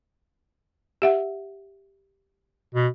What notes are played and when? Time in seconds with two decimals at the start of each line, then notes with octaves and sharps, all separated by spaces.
1.02 G4 E5 F#5
2.74 B2